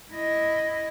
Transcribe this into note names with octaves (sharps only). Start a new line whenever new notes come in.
E4 D#5